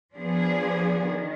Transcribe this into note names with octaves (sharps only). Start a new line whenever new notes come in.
F3 B3 D4 G#4
D#3